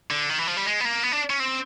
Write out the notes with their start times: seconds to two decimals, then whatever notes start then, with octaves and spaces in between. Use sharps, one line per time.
0.11 D3
0.30 D#3
0.39 E3
0.47 F3
0.57 G3
0.66 G#3
0.80 B3
0.85 A#3
1.03 B3
1.12 D4
1.30 C#4
1.40 C4